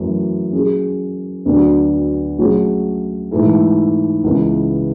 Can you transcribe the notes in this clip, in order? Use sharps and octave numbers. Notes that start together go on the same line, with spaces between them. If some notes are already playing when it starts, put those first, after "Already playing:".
Already playing: F#2 E3 A3
F#3 C#4 G#4
D2 D3 F#3 B3 D4
F#3 A3 C#4 G#4 C#5
G#2 E3 A3 E4 A4
C#2 C#3 E3 B3